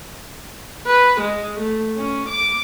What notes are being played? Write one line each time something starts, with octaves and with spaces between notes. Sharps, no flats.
B4
G#3
A3
C#4
D6